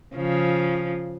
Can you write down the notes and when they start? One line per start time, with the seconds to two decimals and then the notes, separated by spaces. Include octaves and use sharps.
0.15 C#3 F3